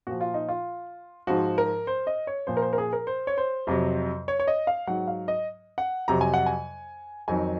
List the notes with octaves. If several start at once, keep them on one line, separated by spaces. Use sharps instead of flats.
A#2 F3 F#4
F4
D#4
F4
G#2 F3 F#4
A#4
C5
D#5
C#5
A#2 F3 C5
A#4
C5
A#4
G#4
A#4
C5
C#5
C5
F2 C3 F#3
C#5
C#5
D#5
F5
G#2 F#3 F#5
F5
D#5
F#5
F2 C3 F#3 A#5
G#5
F#5
G#5
F2 D#3 F#3 G#5